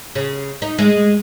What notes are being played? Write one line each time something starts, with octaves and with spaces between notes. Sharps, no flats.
C#3
D#4
G#3